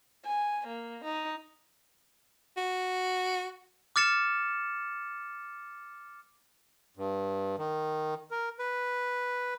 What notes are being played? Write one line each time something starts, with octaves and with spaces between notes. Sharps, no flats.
G#5
A#3
D#4
F#4
D6 F6 A6 C#7 E7
G2
D#3
A#4
B4